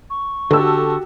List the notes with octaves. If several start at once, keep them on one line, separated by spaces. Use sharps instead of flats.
C#6
D3 F#4 G4 A4 E6